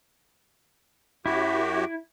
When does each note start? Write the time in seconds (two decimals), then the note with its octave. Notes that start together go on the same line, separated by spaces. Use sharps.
1.26 F#2 E4 F#4 G4